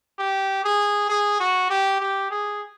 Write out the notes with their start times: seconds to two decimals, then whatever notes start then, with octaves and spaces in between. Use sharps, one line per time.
0.19 G4
0.64 G#4
1.09 G#4
1.40 F#4
1.70 G4
2.00 G4
2.30 G#4